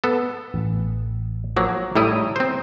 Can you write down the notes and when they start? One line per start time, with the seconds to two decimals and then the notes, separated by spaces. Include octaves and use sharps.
0.04 B3 A4
0.54 A1
1.57 F3 F#3 A#3
1.96 A2 G3 E4 A#5 D#6
2.36 C4 C5